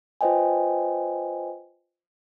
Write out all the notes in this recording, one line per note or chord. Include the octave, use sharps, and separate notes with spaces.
F4 B4 C5 D#5 G5 G#5